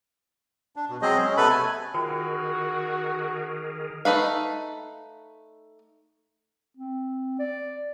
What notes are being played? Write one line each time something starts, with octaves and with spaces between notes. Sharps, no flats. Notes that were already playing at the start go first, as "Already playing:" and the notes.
D4
B2
F#3 G#3 C4 G#4 C5 D#5
G#3 C#4
C3 B3 A4 B4 B5
A3 G#5
D#3 F4 F#4 G#4 A#4 C5 G5
A3 D#4 B4 F5
C4
D5